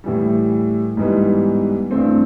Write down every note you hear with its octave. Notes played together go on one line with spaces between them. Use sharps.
A2 E3 G3
G#2 E3 G3 B3
G2 E3 A3 C4